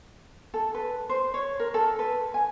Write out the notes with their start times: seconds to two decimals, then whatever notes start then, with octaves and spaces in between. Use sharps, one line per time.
0.54 A4
0.75 B4
1.09 C5
1.34 C#5
1.60 A#4
1.74 A4
1.99 B4
2.34 G#5